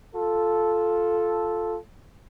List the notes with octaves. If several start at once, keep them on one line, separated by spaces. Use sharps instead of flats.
F4 A4